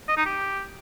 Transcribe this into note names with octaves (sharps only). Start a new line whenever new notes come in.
D#5
D#4
G4